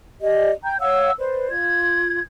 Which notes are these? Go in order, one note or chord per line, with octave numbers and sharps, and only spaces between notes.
G4 D5 D#5
G5 A#5 G6
C#5 F5 F#5 E6
B4 C5 D5
F4 G#6